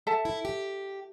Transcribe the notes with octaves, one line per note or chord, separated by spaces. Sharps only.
A4 E5 A5
E4
G4